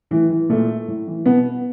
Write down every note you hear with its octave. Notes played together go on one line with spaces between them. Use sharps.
A2 E3
E3
A#2 A3
A2
E3
B2 B3